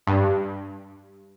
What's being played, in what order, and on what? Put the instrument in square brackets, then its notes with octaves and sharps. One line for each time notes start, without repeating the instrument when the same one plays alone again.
[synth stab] G2